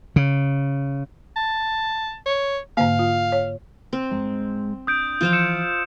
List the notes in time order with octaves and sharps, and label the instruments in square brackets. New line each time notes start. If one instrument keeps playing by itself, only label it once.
[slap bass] C#3
[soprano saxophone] A5
C#5
[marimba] G#2 D3 A#3 [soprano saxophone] F5
[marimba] F4
C#5
[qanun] C4
[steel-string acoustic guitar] G#2 G#3
[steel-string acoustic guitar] D4 [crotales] D#6 G6 D7
[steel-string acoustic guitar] E3 F3 [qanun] F4 C5 F5
[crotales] E6 C#7 E7